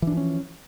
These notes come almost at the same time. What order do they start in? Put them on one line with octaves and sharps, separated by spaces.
E3 D4 F3 C#4